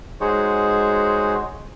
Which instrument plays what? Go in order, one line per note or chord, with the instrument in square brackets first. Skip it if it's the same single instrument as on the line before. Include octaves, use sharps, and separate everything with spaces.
[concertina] G#3 D#4 F#4 G#4 C5 C#5